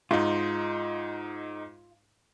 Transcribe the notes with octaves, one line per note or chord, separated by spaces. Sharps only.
G#2 D#4 F4